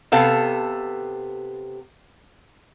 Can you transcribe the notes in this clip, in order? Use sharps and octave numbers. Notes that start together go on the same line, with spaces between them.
C3 B3 A4 F5